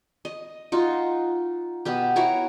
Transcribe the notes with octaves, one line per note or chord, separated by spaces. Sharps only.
D#5
D#4 F4 F#4
B2 B3 G4
E4 F#4 A#4 C#5